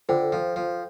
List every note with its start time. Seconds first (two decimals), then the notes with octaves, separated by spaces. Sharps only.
0.09 D3 F4 A4 C5 G5
0.32 F3
0.56 F3